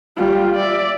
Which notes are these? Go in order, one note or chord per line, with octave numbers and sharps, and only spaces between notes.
G3 F4
D5 E5